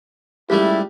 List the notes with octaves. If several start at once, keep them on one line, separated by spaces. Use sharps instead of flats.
C#2 G3 A3 E4 G4